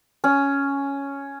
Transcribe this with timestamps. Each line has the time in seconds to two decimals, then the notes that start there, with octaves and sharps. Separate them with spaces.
0.24 C#4